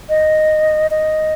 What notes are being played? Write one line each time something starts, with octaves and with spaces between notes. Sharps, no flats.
D#5
D#5